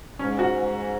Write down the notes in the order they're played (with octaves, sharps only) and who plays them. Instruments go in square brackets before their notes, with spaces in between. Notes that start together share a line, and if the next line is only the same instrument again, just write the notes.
[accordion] G#2 [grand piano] C#4
[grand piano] F#4